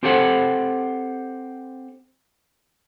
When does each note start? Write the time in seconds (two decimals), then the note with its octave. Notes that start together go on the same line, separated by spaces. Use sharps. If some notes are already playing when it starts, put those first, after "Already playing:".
0.03 C4 G4 A4 C5 E5 F#5